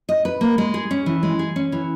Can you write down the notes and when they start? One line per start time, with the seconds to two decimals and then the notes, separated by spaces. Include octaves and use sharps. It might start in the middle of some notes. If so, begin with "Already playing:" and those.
0.09 D#5
0.25 B4
0.41 A#3
0.58 G#3
0.74 G#4
0.91 C#4
1.06 E3
1.23 G#3
1.39 G#4
1.56 C#4
1.72 E3